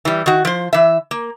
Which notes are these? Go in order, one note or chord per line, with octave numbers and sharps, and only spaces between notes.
E3 G3
D#3 F#4
F3 C5
E3 E5
A#3